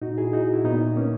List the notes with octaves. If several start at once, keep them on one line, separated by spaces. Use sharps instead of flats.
A#2 D#4 F#4
E4 G#4
D#4 F#4
E4
A#2 B3 D#4
A#3 C#4